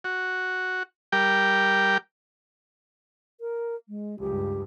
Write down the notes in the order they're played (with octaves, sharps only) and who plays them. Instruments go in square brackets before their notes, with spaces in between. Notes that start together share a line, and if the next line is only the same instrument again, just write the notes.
[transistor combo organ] F#4
G3 G4 A#4 G5
[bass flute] A#4
G#3
[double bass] C#2 G2 [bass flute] G4